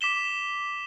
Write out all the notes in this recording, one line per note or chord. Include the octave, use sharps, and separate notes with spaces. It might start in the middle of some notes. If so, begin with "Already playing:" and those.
D6 B6 E7 G7